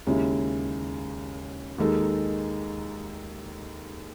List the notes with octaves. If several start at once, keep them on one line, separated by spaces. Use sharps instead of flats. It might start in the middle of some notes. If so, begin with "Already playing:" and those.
D#2 C#3 G#3 C#4 E4
D#2 D#3 G#3 D#4 A4